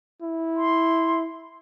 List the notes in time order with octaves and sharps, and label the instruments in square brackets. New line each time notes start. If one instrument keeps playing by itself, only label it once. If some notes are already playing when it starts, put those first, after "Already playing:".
[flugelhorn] E4
[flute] C6